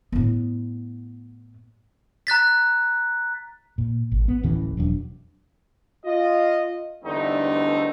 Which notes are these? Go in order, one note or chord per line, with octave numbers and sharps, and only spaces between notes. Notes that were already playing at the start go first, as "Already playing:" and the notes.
A2 B3
A#5 F#6 A6 B6
A#2
G#1
B3
D1 A2 E3 C#4
E1 F#3 D4
F4 D#5
E2 G2 D3 A3 C4 D#4